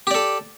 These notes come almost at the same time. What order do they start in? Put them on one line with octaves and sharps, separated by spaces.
G4 D5 A4